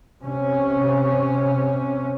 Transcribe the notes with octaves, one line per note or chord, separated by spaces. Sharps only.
C3 C#4